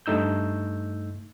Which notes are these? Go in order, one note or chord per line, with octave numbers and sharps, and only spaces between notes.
G2 A3 D#4 E6 G6